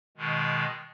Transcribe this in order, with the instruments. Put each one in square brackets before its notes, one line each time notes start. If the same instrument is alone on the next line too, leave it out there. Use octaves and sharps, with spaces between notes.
[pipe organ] B2 D#3 G#3